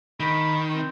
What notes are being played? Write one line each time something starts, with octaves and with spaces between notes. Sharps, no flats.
D#3 B5
C4